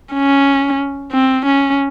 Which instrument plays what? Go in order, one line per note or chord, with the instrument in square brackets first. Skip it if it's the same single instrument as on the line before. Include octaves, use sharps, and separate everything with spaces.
[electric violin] C#4
C4
C#4